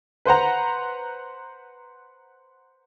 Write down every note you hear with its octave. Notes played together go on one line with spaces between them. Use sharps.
B4 C5 F#5 A#5